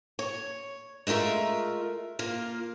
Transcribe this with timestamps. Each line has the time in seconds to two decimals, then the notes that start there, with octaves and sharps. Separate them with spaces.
0.19 C#5
1.07 G#3 A3 F4 A#4 E5
2.19 A#3 F4